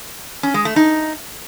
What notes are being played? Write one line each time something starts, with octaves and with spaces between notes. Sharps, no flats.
C#4
G#3
A3
D#4